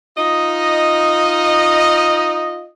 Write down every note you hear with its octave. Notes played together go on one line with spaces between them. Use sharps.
D#4 F4 D#5